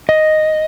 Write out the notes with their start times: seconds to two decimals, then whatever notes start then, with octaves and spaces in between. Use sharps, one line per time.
0.09 D#5